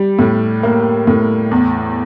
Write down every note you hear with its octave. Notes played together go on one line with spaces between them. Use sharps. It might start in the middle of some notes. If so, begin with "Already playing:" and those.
Already playing: G3
A2
A#3
A2
E2